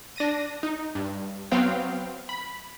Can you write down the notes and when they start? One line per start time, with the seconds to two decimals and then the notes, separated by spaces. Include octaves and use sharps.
0.16 D4 A#6 D#7
0.63 D#4
0.95 G2
1.52 F#3 B3 C4 F5 G5
2.29 B5